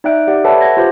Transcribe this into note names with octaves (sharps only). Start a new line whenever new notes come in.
D#4 D5 E5 G5 F#6 D7
G4 D5 F#5
A4 B4 C#5 E5 F#5 A5
F#5 G#6 A#6
F4 G4 C5